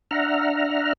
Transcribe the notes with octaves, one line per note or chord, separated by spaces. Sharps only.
D4 E5 F#5 A#5 F6